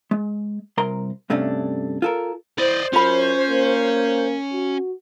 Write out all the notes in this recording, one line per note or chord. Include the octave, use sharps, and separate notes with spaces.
G#3
C2 A#4 A#5 C6
G2 C3 A3 C#4 D4
F4 A4 A#4
E4 C5 D5 D#5
F#2 C#4 F4 B5
A#3
F#4